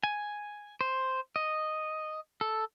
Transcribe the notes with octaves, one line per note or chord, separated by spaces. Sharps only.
G#5
C5
D#5
A4